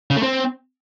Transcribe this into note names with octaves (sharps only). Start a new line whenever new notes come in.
C#3
A3
C4